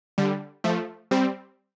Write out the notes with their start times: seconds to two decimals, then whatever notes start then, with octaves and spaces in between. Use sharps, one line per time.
0.18 D3 G3
0.64 F3 A3
1.11 G3 C4